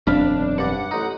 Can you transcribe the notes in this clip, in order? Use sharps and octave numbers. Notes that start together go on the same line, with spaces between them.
E1 F#2 C4 D4 F5 B5
G2 D5 F#5
A1 D#4